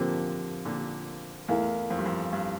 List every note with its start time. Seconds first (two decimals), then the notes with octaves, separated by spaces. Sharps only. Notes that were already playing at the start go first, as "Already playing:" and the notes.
Already playing: A#2 D3 F3 C4 G4 A#4
0.65 A#2 D3
1.48 E2 A3 E4 A#4 F5
1.90 F2
1.98 G2
2.06 F2
2.33 G2